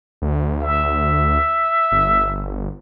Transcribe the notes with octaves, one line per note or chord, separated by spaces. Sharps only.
D2
E5
G1